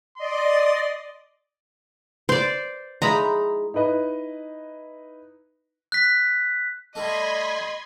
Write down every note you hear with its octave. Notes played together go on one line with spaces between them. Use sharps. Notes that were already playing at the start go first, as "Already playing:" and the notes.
D5 D#5 C6
C5 D5
G#3 D#4 E4 A#5 B5
D#4 E4 B4 D#5
F#6 B6
G3 A3 D4 D#5 B5 C6 G#6